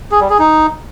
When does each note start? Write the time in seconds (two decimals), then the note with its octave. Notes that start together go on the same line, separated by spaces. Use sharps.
0.11 G#4
0.21 G3
0.30 G#4
0.39 D#4